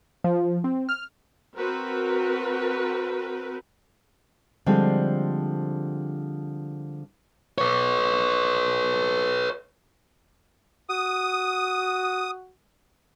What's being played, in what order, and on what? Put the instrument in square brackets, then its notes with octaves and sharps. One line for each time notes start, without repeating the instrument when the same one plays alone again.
[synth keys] F3
C4
F6
[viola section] C4 F#4 A#4 B4
[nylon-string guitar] D3 F3 G3 G#3 C4
[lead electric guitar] B4 C#5
[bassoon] F#4 [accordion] D#6